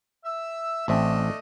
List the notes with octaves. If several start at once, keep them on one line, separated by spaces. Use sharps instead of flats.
E5 E6
A1 A3 C4 D4 D#5 E5